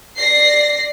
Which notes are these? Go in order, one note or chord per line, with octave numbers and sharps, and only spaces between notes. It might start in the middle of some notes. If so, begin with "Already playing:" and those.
D5 A#6 C7